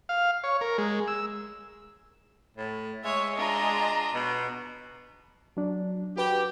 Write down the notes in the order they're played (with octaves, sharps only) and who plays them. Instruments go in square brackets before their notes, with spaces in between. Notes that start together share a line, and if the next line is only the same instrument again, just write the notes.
[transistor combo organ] F5
C#5
A#4
G#3
E6
[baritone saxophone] A2
[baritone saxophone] G#3 [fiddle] C#5 [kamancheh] E5
[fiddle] D4 F4 [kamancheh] D#5 A#5
[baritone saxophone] B2
[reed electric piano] F#3 D4
[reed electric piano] F#4 B4 [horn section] G4